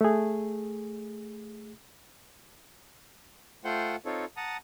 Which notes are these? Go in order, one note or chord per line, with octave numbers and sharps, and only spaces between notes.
A3 G#4
A3 F4 C5 F#5 G5
C4 D#4 F4 A4 C#5
F#5 A5 A#5 D#6